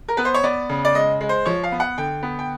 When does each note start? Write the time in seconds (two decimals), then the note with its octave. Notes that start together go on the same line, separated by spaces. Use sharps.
0.08 A#4
0.17 B3 B4
0.25 C5
0.34 C#5
0.43 B3 D5
0.69 C#3
0.85 D5
0.95 G#3 D#5
1.21 G#3
1.29 C5
1.46 F3 C#5
1.63 F5
1.72 B3
1.80 F#5
1.98 D3 G5
2.23 B3
2.39 G5